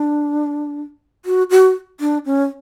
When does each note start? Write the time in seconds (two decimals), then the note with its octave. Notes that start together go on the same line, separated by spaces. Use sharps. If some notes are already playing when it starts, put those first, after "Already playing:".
Already playing: D4
1.25 F#4
1.50 F#4
2.00 D4
2.25 C#4